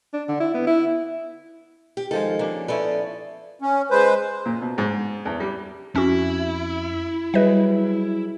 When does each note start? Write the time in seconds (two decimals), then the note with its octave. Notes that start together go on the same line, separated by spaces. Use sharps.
0.13 D4
0.29 D3
0.40 E4
0.54 B3
0.67 E4
1.97 G4
2.11 D#3 F3 G#3 A4
2.39 A#3 C#4 D4
2.68 F3 B3 C#4 E4 A4 D5
3.62 C#4
3.91 G#3 B4 C5
4.45 A#2
4.62 B2
4.78 G#2
5.25 E2
5.40 G3
5.95 F2 C#4 E4 F#4
7.34 F#3 G3 G#4 B4 D#5 E5